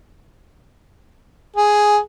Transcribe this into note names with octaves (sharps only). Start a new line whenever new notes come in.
G#4